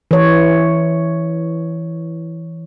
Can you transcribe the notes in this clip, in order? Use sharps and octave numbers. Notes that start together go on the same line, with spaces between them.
E3 C#5